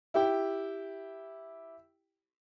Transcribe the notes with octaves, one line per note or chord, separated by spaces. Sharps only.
E4 G4 G5